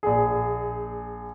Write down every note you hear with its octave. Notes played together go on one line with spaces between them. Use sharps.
A#1 G#4